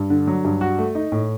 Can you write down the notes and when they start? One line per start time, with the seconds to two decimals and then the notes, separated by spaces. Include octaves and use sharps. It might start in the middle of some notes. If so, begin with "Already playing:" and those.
Already playing: G2
0.10 D3
0.27 F#3
0.45 G2
0.61 F#4
0.79 A3
0.95 D#4
1.12 A2